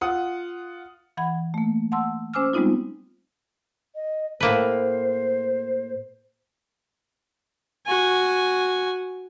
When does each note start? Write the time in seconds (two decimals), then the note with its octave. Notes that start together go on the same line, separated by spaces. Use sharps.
0.01 F4 F#5 D#6
1.17 E3 F#5 B5 G#6
1.54 A3 A#3
1.92 F#5 A5 C6 E6
2.33 C#4 C5 G#5 D6 E6 F6
2.53 G3 G#3 B3 C4 D#4 F4
3.95 D#5
4.40 A2 A#3 B4 C5
7.87 F#4 G#5